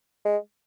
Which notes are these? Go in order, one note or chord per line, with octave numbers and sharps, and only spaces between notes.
G#3